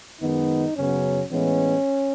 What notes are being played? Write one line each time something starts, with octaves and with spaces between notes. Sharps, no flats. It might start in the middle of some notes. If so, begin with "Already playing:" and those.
F#2 D#3 G#3 B3 D#4
F#2 C#3 F#3 B3 C#4
A2 E3 G#3 B3 C#4